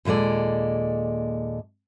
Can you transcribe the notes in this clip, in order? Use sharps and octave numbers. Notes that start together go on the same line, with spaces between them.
D#2 A#2 G#3 A4 D5